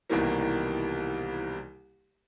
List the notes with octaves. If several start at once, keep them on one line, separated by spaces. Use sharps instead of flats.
C2 B2 D#3 E3 G3 A#3